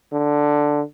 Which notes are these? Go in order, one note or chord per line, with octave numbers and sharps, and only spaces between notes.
D3